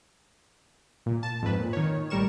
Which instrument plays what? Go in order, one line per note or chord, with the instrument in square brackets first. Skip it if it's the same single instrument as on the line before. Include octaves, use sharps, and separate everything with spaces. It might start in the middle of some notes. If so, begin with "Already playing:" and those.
[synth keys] A#2
A5
F2 G#2 B4
A#2
D#3 C#5
A1 G3 A#4 C#6 E7